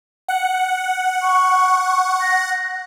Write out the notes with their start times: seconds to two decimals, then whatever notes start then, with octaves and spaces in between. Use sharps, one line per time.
0.28 F#5
1.22 C#6
2.21 A#6